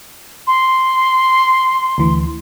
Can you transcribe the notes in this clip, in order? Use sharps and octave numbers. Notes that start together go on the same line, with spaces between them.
C6
D2 E3